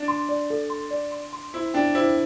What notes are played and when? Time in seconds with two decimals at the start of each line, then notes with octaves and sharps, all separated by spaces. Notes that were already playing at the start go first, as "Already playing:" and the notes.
Already playing: D4
0.08 C6
0.29 D5
0.50 A4
0.70 C6
0.91 D5
1.12 C6
1.33 C6
1.54 E4 C5
1.74 D4 G5
1.95 E4 C5